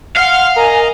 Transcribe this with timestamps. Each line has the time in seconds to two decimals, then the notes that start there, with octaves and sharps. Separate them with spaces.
0.16 F5 F#5 C6 F6
0.56 A#4 D#5 G#5 A#5